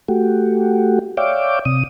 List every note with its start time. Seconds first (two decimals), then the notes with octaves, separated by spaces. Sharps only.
0.08 A3 F#4 G4
1.17 C#5 D5 E5 F5 G5 D6
1.65 C3 D#6